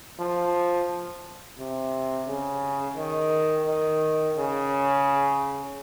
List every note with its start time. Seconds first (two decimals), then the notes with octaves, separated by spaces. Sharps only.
0.19 F3
1.58 C3
2.27 C#3
2.96 D#3
3.67 D#3
4.36 C#3